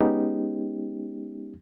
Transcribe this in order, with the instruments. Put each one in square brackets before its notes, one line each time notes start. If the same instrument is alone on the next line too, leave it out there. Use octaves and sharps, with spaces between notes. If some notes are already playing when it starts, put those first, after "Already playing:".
[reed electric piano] G#3 B3 C#4 D#4 G4